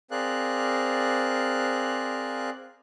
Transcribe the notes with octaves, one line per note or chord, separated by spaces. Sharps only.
C4 G#4 A#4 D5 F5 F#6